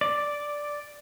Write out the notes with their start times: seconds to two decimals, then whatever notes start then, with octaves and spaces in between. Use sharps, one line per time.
0.01 D5